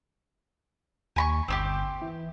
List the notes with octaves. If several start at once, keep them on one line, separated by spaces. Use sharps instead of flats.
D#2 G#5 B5 C#6
G1 C4 D4 G4
E3